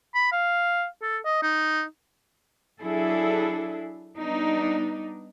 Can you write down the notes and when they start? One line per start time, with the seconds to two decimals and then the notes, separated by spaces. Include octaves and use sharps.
0.15 B5
0.32 F5
1.02 A4
1.25 D#5
1.43 D#4
2.81 F#3 D4 E4 G#4 A4
4.16 G3 B3 D4 D#4